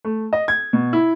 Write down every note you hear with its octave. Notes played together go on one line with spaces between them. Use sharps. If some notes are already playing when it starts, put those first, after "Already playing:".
A3
D#5
G#6
B2
E4